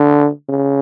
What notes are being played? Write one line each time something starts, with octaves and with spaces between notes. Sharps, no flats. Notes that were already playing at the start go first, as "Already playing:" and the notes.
Already playing: D3
C#3